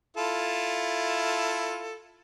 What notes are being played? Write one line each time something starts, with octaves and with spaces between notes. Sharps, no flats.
E4 F4 A4